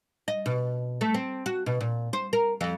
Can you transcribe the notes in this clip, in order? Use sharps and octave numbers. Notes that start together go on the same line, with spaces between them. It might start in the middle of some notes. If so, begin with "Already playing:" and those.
D#5
B2
A3
C4
F#4
B2
A#2
C5
A#4
F2